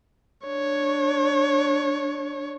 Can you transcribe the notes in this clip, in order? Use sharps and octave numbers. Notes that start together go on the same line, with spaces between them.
D4 C#5